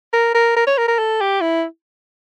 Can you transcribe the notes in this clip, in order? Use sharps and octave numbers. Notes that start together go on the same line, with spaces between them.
A#4
A#4
A#4
C#5
A#4
A#4
A4
G4
E4